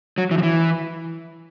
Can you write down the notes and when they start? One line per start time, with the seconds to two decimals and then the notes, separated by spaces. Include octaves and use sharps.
0.18 F#3
0.31 E3
0.38 F3
0.43 E3